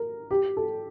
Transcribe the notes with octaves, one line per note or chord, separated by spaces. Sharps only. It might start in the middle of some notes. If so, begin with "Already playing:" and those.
Already playing: A#4
G4
A4